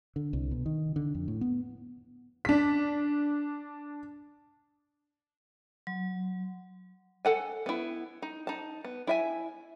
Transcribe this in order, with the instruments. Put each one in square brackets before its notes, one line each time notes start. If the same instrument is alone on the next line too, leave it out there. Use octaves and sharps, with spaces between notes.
[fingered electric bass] D3
C2
B2
D#3
D3
F2
A2
B3
[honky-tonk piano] D4 B6
[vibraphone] F#3
[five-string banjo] A4 F#5 G#5
B3 E4
D#4
D#4 A5
B3
E4 E5 G#5